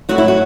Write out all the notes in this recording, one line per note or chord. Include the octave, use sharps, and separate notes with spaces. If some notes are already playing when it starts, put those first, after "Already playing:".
A2 F#3 F#4
E4
F#4